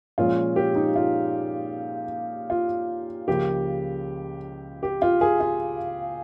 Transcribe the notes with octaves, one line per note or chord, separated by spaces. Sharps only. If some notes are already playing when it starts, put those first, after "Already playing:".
A#2 F3 G#3 C#4 F4
G4
D#4
F4
F4
C#2 C#3 F3 A#3 G4
G4
F4
G#4
F4